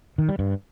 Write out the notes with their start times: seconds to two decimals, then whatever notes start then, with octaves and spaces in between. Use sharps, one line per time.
0.18 D#3
0.29 G3
0.39 G2